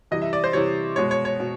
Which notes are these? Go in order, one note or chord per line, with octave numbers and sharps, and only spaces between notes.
C3 E3 G3 D#5
E5
D5
C5
C3 E3 G3 C#5
B2 G#3 C#5
C#5
C#5
B2